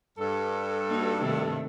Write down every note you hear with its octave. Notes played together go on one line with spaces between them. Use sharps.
G2 A4
A#3 D#4 F#4
C3 D#3 A3